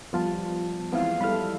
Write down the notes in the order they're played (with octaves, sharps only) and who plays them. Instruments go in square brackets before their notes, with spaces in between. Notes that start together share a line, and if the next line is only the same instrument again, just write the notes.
[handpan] F3 G3 [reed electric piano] B3 F4 A5
[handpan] E3 G#3 [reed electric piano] B3 C4 E4 [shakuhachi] F5
[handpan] G3 E4 A4 [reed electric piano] B5 F6